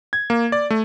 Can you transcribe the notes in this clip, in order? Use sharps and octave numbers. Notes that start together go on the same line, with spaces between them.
G#6
A#3
D5
A3